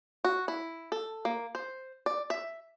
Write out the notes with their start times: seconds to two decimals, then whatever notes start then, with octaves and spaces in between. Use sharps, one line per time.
0.24 F#4
0.48 E4
0.92 A4
1.25 A#3
1.55 C5
2.06 D5
2.30 E5